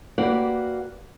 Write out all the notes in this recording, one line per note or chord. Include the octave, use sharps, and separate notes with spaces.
A#3 F#4 G4 B4 D5 F#5